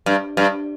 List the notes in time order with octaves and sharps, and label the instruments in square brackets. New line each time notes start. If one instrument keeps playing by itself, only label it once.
[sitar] G2
G2